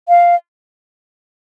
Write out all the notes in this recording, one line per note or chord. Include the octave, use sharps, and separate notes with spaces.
F5